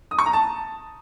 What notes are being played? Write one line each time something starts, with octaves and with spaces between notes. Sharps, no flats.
D#6
C#6
A#5
A5